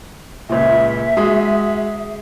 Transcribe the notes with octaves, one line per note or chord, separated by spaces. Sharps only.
C#2 A#2 E5
G#3 F#4 D#6